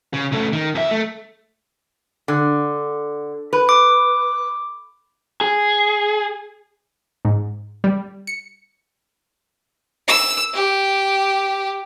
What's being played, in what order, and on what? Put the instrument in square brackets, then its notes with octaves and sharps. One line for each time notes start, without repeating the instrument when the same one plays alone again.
[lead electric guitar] C#3
C#3 A3
D#3
F2 E5
A3
[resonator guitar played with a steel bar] D3
B4
[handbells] D6
[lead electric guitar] G#4
[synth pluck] G#2
G3
C#7
[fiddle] E6
G4